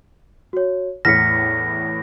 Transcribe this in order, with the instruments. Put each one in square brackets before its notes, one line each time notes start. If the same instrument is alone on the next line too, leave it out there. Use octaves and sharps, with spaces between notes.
[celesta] F#4 C#5
[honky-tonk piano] E2 A2 [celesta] F6 B6 C#7 [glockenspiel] A#6